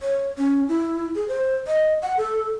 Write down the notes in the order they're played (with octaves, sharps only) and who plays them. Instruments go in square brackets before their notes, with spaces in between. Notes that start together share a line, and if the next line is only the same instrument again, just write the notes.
[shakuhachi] C#5
C#4
E4
G#4
C5
D#5
F#5
A4